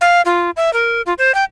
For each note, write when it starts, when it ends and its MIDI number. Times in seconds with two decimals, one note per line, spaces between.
0.01 0.22 77
0.25 0.51 65
0.57 0.73 76
0.73 1.02 70
1.06 1.14 65
1.18 1.34 72
1.35 1.44 79